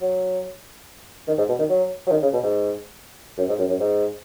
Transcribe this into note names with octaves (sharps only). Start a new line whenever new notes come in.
F#3
D#3
G#2
B2
D#3
F#3
F#3
D#3
C#3
B2
G#2
F#2
G#2
F#2
F#2
G#2